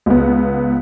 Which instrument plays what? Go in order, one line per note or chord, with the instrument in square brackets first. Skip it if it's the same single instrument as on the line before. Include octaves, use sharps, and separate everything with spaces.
[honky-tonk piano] C#2 B3